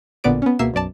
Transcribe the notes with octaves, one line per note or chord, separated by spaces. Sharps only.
A1 A#2 D3 B3 D5 D7
B3 C#4
C#2 B2 A#3 E5 C7 E7
B1 F#2 D5 A5